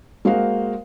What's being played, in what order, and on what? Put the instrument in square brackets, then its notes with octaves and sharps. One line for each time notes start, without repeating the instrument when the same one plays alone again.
[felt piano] G#3 A#3 F#4 C5 F5